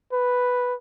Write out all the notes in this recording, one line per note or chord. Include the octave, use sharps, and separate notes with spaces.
B4